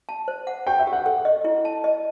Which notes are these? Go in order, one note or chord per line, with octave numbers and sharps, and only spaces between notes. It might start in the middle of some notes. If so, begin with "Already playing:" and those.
A5
C5
F#5
G4 G5
E5
G4
F#5
A4
D#5
E4
A5
D#5